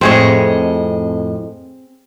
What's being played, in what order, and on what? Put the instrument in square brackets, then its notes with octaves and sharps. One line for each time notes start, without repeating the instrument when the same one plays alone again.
[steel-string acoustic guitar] F2 A2 D#5 [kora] C4 G#4 C#5